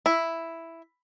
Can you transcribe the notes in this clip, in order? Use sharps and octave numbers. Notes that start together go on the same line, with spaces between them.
E4